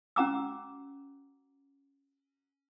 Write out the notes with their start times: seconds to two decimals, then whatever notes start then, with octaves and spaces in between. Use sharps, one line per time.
0.16 C#4 F#4 F#5 A#5 D6 E6